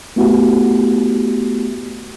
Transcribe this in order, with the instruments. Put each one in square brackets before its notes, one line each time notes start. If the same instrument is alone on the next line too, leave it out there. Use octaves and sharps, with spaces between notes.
[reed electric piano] A3 B3 E4 F#4 G4